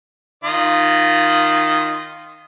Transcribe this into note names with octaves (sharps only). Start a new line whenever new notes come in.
D#3 F4 D#5